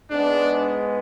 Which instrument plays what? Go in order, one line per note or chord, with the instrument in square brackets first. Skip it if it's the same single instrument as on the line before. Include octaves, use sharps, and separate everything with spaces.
[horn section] G#2 G#3 B3 D4